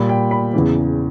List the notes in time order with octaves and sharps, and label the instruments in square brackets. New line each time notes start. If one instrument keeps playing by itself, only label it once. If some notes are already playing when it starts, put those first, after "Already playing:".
Already playing: [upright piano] A#2 G3 B5
G5
B5
E2 C#3 E3